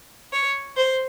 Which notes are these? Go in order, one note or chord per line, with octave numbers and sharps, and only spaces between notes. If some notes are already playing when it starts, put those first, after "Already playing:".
C#5
C5